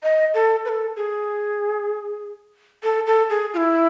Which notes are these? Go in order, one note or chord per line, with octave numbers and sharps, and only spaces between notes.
D#5
A4
B4
A4
G#4
A4
A4
G#4
F4
E4